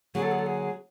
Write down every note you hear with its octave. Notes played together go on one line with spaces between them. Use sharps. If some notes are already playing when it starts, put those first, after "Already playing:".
D3 F#3 A#3 G#4
A4
G#4
A4
G#4